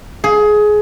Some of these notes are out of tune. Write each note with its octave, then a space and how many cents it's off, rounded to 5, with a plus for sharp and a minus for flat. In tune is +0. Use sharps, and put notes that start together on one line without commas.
G#4 +20